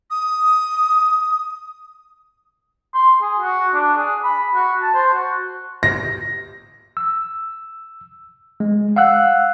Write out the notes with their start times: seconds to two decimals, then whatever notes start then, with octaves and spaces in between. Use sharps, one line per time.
0.11 D#6
2.94 C6
3.21 G#4
3.40 F#4
3.74 D4
3.97 G#4
4.24 B5
4.55 F#4
4.82 A5
4.94 C5
5.14 F#4
5.83 A#6
6.97 E6
8.60 G#3
8.96 F5 F#5 E6 F#6